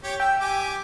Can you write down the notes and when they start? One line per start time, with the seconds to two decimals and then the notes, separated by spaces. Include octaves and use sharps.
0.03 G4 C#5
0.20 E5 G5
0.40 G4 G#5 D6